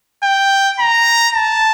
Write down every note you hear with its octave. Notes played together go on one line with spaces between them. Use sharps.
G5
A#5
A5